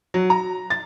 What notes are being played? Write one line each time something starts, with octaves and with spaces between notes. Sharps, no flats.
F#3
A#5
A6